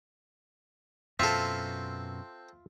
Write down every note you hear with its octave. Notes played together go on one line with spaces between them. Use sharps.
F#2 B2 C4 F4 A4 E5